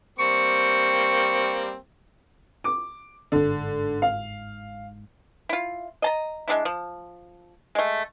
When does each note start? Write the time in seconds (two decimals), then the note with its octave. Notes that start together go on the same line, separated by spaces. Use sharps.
0.19 G3 A#3 C4 C#6
2.64 D6
3.32 G1 G#2 D3
4.02 F5
5.49 E4 F4
6.02 D#5 A5 A#5
6.48 G#3 B3 D4 E4
6.65 F3
7.75 G#3 A3